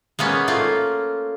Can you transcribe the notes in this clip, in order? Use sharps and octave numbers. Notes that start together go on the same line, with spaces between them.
G#3 A#3 B3 C#4
A3 A#3 F4